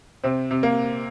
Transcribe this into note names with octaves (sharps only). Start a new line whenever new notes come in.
C3 C4
C3
A#3